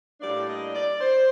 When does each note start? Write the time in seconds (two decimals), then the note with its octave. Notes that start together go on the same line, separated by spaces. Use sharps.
0.20 A2 G3 A#3 D4 D5
0.47 D#5
0.74 D5
1.01 C5